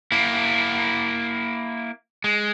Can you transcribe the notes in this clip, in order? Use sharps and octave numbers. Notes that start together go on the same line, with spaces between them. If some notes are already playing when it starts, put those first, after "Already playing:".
A#3 E4
G#3